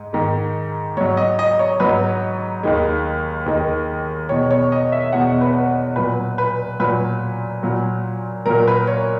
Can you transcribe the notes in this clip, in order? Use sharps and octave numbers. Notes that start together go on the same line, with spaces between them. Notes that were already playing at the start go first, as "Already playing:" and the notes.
Already playing: G#2 G#3
G#2 D#3 G#3
G#2 F#3 C#5
D#5
D#5
C#5
G#2 F#3 B4
D#2 D#3 G#3
D#2 D#3 G#3
E2 B2 G#3 C#5
C#5
D#5
E5
E2 B2 G#3 F#5
B4
A#2 F#3 B4
B4
A#2 F#3 B4
A#2 F#3
A#2 F#3 A#4
B4
C#5